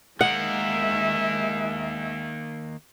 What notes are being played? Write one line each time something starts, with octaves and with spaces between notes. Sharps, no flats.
D#3 G#3 A#3 E5 F#5